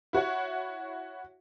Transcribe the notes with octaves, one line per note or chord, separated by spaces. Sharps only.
E4 F#4 C#5 F#5